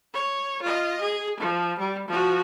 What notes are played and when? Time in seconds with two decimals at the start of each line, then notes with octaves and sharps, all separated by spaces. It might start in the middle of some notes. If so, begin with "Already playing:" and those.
0.13 C#5
0.62 F4 D#5
1.01 G#4
1.40 F3
1.79 G3
2.08 F3 F#4